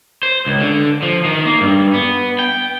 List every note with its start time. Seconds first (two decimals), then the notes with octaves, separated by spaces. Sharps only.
0.23 C5
0.46 C#2
0.60 D3
1.02 F3
1.25 D#3
1.45 A#3
1.61 G2
1.94 B3
2.39 G5